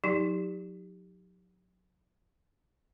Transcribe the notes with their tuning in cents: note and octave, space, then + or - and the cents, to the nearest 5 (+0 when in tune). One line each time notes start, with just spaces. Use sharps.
F#3 -35 D#4 +40 G4 +15